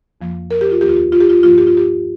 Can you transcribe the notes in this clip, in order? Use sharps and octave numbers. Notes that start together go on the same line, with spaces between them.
F2 F3 A#3
A#4
G4
F4
D#2 D#3 A#3 G4
F4
G4
F4
G4
F4
G2 F3 A#3 F4
G4
F4
G4